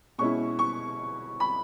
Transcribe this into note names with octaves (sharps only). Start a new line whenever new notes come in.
B2 G#3 C#4 E4 C#6
C#6
B5